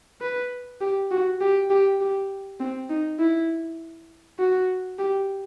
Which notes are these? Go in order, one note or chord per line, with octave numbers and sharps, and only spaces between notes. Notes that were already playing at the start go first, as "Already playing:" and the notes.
B4
G4
F#4
G4
G4
G4
C4
D#4
E4
F#4
G4